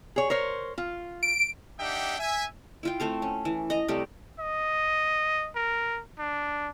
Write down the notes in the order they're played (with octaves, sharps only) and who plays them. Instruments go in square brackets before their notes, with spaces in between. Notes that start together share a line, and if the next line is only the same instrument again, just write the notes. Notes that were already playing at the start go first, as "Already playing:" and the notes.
[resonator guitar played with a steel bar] G#4 C#5
A#4 C5 C#5
F4
[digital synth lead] D7
[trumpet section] D4 D#4 G4 E5 F#5 G5
E5 G#5
[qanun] E4 F4 G5
A3 C4 A4 F5
C#4
E3
D#5 A#5
C3 G3 A3 G4
[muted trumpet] D#5
A#4
D4